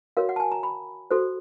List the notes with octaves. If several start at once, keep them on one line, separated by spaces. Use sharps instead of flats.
F#4 A#4 C#5 F5
F#5
A5
G#5
A#5
B5
F#4 A4 C5